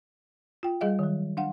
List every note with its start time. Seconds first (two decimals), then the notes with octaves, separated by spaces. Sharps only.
0.63 F4 G5
0.81 G3 G#4 D#5 F5
0.99 D#3 F#3
1.37 D4 F5 F#5